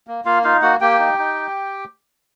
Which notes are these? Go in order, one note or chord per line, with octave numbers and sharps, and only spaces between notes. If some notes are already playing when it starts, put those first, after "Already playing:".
A#3
A#3 F4 F5
D#4 F4 F5
A#3 F#4 F#5
A#3 G4 G5
D#4
D#4